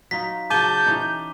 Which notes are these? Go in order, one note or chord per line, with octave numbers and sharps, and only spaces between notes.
F#3 D#4 F4 B6
C#3 F#3 A5 D6 G6 D#7 G7
E3 C#4 D#4